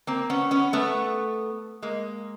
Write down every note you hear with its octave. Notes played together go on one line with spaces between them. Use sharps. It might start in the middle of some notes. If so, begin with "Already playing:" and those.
A#3 C4
B3 C#4
B3 C#4
A3 B3
G#3 A#3